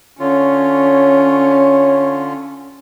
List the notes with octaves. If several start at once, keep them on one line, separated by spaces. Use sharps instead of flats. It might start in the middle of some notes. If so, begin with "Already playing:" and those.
D3 C#4 F4 C#5